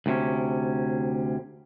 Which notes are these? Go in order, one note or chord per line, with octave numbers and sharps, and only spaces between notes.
D2 C3 C#4